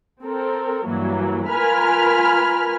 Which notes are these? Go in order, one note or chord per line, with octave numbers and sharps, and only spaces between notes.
C4 A4 A#4
G2 E3 F#3 A#3
F4 A#4 B4 G#5 B5 F6